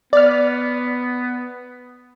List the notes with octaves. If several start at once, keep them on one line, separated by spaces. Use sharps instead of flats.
B3 D5 F6